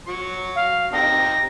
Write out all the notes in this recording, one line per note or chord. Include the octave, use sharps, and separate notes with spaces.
F#3 C#6
F5
C4 D#4 G4 A#6